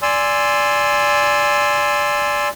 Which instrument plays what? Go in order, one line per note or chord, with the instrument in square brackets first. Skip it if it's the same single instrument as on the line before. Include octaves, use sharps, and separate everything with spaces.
[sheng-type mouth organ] D5 G#5 C6 E6